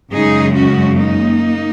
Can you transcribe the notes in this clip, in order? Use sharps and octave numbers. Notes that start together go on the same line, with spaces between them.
F#2 C#3 G#3 D#4 G#4
C#4 F#4
A#3 D#4